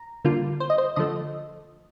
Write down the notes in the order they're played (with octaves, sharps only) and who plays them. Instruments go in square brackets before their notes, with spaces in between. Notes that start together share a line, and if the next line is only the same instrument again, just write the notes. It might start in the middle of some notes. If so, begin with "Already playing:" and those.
Already playing: [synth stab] A#5
D3 G3 A#3 F4
C5
D#5
C5
D3 F3 A3 D#5